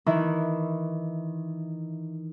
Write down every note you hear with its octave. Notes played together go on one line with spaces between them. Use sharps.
D#3 E3 E4